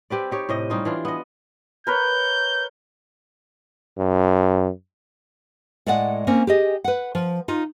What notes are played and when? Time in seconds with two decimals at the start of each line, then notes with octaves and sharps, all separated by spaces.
0.10 C4 G4 B4 D5
0.31 D#4 G4 C#5
0.49 A2 C3 D#5
0.70 G3 C#4 D#4 F4
0.85 E3 D4 F4
1.05 B3 D#5
1.87 A#4 B4 C#5 G6
3.98 F#2
5.86 A2 G#3 D5 F#5
6.27 A#3 C4 C#4
6.47 G4 G#4 D#5
6.84 B4 F#5
7.15 F3
7.48 D#4 F4